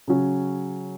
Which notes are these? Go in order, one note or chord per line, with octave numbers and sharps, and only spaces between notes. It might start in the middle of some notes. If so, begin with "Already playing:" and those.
C#3 F#3 C#4